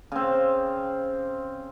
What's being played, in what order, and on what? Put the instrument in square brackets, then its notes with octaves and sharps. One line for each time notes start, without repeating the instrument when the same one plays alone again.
[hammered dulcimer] C#3 C4